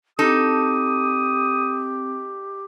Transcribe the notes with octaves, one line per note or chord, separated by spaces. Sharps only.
C4 D#4 G4 A4 D#6